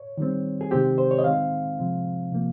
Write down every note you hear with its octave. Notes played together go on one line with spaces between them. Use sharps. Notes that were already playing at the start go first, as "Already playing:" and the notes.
Already playing: C#5
D#3 G3 C4
G#4
C3 D#3 G#3 C4 G4
C5
C#5
D#5
D#3 G#3 C4 F5
C3 F3 G#3 C4
C3 F3 A#3